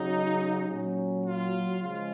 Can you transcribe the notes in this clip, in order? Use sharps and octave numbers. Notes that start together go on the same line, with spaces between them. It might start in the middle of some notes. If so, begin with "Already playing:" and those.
Already playing: C#3 F#3 D#4
A#2 F#3 C#4
F4
C#3 F3 G#3 F4